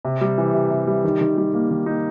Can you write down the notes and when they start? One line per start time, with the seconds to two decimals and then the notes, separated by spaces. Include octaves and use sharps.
0.05 C3
0.21 G3
0.38 E3
0.54 C3
0.70 C3
0.87 G3
1.04 D#3
1.21 D#3
1.37 G3
1.54 A#3
1.71 D#3
1.86 D#4